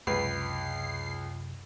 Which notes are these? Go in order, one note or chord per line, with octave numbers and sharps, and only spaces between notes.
C#2 F#2 C3 B4 C7